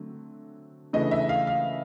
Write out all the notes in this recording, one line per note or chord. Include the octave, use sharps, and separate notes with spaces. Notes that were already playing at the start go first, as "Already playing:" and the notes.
Already playing: D3 F#3 A3 C4
C#3 E3 A3 D4 D#5
E5
F5
F5